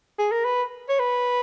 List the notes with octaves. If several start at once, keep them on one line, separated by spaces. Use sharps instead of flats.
G#4
A#4
B4
C#5
B4